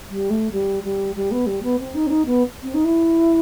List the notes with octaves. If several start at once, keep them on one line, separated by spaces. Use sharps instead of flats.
G3
A3
G3
G3
G3
B3
G3
B3
C4
D#4
C4
D#4
B3
C4
D#4
E4